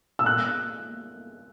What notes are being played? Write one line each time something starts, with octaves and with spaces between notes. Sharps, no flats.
E6
F#6